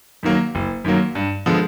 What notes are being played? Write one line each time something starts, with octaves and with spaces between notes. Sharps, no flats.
F#2 D#3 F#3 A#3
F#1
F#2 D#3 F#3 A#3
G2
D3 F3 G#3 B3